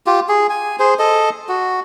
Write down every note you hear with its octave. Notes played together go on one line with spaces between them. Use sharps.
F4 G4
G#4
G#5
G#4 C5
A4 D#5
F#4